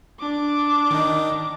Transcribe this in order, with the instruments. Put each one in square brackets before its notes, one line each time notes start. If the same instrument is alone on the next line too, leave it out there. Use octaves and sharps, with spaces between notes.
[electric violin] D4 D6
[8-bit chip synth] D#3 D#5